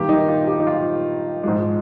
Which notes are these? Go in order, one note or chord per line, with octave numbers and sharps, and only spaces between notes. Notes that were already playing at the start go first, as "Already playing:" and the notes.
Already playing: G2 D#3 A#3 G4
D#4
F4
G4
D#4
F4
G#2 F3 G#3